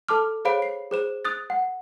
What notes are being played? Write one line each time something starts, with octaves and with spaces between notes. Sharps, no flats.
A4 A5 D6 F6
G#4 C5 C#5 F5 B5 D7
C7
G#4 C5 E7
D#6 F#6 A6
F#5